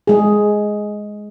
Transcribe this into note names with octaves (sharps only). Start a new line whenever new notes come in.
G#3 G#4